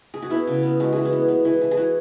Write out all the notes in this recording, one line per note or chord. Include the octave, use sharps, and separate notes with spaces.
G#4
F#4
B3 E4
C#3
B3
G#3 F#4
E3 G#4
F#4
B3
B3
E3
E3
G#4
E3 F#4